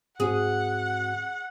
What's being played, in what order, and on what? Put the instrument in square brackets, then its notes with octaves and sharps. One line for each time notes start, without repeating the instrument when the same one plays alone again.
[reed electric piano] G#2 C4 F#4 [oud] G#4 [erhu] F#5